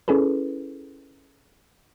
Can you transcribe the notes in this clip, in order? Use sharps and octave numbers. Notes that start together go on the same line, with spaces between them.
C#4 E4 G#4 A4 B4